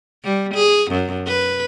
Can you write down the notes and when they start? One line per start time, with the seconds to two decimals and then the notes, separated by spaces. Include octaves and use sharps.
0.24 G3
0.55 G#4
0.92 F#2
1.28 B4